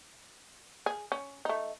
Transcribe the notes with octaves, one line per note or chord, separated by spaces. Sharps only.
G#4
C#4
A3 D#4